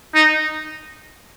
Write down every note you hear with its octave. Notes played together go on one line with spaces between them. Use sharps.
D#4